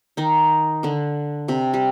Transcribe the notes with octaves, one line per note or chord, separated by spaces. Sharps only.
D#3 D#4
D3 D4
C3 C4
G3